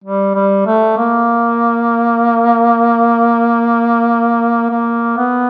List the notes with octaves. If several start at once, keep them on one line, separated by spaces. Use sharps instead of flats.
G3
G3
A3
A#3
A#3
B3